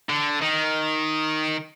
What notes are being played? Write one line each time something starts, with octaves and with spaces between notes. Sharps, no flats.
D3
D#3